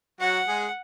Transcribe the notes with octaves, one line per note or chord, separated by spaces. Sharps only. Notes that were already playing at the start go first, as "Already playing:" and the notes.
F#3 F#4 F#5
G#3 G#4